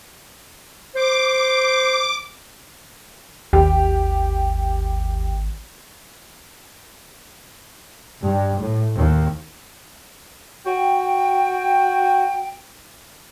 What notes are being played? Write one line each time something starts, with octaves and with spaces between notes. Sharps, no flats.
C5 D6
G#1 D#2 G4
G2
A2
D#2
F#4 G5